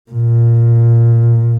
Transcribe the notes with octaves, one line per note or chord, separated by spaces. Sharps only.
A#2